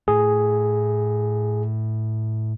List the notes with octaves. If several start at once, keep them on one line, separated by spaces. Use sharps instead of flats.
A2 A3 G#4